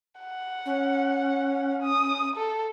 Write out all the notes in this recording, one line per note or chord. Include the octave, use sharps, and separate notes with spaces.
F#5
C#4
D#6
A4